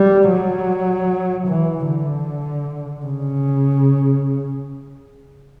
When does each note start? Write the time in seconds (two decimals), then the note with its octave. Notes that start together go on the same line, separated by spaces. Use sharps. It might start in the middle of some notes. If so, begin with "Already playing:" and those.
Already playing: G3
0.30 F#3
1.48 E3
1.87 D3
3.06 C#3